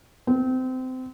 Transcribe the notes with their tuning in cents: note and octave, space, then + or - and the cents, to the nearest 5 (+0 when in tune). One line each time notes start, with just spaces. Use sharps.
C4 -25